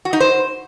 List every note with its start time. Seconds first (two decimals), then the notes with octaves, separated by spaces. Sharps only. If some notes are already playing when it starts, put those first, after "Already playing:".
0.05 F#4
0.13 D#4
0.20 C5